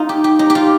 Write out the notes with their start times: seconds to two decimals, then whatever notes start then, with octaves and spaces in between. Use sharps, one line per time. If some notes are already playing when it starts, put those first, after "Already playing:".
Already playing: D#4 F4
0.09 G4
0.24 G4
0.39 D#4
0.50 G4
0.55 F4